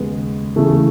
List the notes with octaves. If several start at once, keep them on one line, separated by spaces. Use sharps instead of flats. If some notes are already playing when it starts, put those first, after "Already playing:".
Already playing: D#2 C#3 G#3 B3
E2 C#3 E3 A3